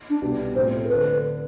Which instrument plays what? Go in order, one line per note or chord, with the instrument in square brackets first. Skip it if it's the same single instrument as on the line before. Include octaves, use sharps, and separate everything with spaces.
[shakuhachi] D4
[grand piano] C2 B2 B3 D4 G4
[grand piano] A2 F3 C4 [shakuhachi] C5
[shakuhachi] A4
[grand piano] D3 [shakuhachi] B4